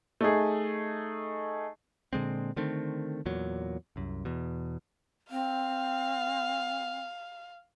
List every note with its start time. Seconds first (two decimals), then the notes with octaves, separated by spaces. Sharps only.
0.21 A3 D#4 G#4
2.13 A#2 D3 G#3 C4
2.56 D3 D#3 A3 C4
3.26 E2 A#2 F#3
3.96 C2 F#2
4.25 E2 B2
5.31 C4 F5